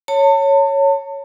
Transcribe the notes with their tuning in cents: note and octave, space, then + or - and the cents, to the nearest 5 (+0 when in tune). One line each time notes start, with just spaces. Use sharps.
C#5 +0 A5 +35